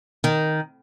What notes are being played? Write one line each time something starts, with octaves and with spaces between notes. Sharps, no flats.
D#3